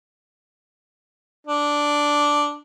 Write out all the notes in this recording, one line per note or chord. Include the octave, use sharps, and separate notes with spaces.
D4